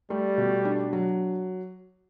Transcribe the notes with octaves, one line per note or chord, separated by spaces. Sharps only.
G3 A3
B2
D4
F#3